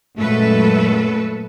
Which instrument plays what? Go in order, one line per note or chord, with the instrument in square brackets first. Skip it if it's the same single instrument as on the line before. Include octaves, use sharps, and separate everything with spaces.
[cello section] F#2 A#2 G#3 A3 A4 B4